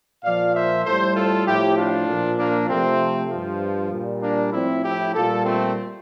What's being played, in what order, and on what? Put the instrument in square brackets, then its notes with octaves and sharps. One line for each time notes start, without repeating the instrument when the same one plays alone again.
[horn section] A#2 F3 D5 F5
C5 E5
A2 G3 A4 C5
F4 A4
A2 F3 E4 G4
D4 F4
A#2 F3
A#3 D4
C3 F3 A3 C4
G2 F3
A#2 G3
A#3 D4
A2 F3 C4 E4
E4 G4
A#2 G3 F4 A4
A3 C4